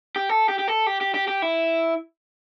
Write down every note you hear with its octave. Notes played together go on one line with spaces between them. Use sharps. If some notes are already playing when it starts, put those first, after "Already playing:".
G4
A4
G4
G4
A4
G4
G4
G4
G4
E4